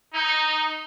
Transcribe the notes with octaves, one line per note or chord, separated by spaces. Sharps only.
D#4